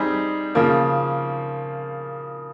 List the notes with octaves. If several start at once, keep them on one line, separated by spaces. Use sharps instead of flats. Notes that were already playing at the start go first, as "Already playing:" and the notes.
Already playing: G3 C4 D#4 G#4
C#3 F3 A#3